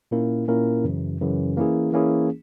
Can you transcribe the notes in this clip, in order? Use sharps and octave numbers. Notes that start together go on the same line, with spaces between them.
A#2 A#3 C#4 E4 A#4
A#2 A#3 C#4 E4 A#4
F#2 C#3 E3
F#2 C#3 E3
E3 A#3 C#4 E4 G#4
E3 A#3 C#4 E4 G#4